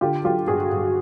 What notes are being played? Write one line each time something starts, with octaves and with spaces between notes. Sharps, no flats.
D3 F4 G4
F#3 F4 G4
G2 F#4 G#4
G2